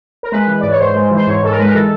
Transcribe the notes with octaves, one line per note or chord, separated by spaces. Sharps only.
A#4
G#3 B4
E3
G#2 D5
C#5
G#2 C5
G#3
E3
C5
G#2 C#5
G#2 A4
A#4
G#3 B4
A#4
E3 A4